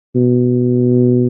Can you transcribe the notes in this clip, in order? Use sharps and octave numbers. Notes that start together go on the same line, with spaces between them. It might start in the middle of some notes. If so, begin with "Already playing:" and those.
B2